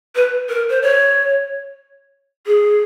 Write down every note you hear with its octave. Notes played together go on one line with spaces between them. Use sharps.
B4
A#4
C5
C#5
G#4